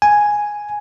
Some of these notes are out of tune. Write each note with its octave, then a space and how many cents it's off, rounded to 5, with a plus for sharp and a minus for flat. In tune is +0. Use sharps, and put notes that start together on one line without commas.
G#5 +0